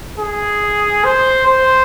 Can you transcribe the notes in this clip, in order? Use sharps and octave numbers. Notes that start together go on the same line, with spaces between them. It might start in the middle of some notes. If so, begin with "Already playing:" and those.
G#4
C5
C5